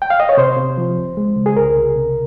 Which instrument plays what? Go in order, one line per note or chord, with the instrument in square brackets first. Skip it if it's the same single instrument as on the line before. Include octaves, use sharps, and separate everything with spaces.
[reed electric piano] G5
F5
D#5
C#5
C3 C5
C3
F3
C#2
G#3
C#3
G#4
C2 A#4
C2
C3